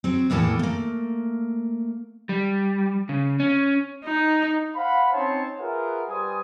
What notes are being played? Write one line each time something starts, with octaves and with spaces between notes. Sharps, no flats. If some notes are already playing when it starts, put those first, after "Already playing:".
F#3 C4
E2 A2 E3 A#3 A4 A5
A3 A#3
G3
C#3
C#4
D#4
C5 F5 F#5 B5
C4 C#4 D#4 C#5 A5 C6
F4 G#4 A#4 B4 E5 F#5
G3 B4 C5 G#5 D#6